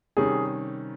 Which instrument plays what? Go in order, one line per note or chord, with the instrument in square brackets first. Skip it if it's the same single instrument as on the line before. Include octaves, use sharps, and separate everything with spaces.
[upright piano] C3 D#3 G3 C#4 [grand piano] G#4